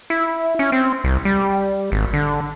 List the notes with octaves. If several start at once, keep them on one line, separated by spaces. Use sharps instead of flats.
E4
C#4
C4
C2
G3
G#1
D3